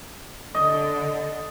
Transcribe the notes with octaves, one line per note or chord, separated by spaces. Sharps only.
D3 D#5